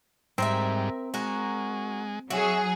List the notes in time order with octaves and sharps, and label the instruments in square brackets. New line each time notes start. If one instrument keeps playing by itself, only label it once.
[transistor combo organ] G#2 G3 [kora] C4 [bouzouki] A#4 C#5 E5
[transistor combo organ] G#3 [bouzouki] F#4 A#4
[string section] F#3 G#4 [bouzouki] F#4 [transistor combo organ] E5